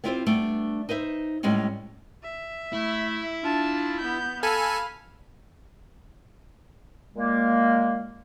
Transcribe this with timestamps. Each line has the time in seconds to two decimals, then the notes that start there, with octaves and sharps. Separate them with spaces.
0.04 B3 C4 E4 F4 G4 C5
0.26 G3 A3 B3 D4
0.89 D#4 B4 C5 E5
1.43 A2 G3 G#3 B3 C#4
2.23 E5
2.73 A3 E4
3.44 D4 F4 A5
4.00 B3 G6
4.43 A4 F5 G#5 B5
7.15 A#2 G#3 A#3